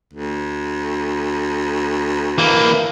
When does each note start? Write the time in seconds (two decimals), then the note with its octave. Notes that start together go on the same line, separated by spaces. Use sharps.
0.13 D2
2.38 E3 A#3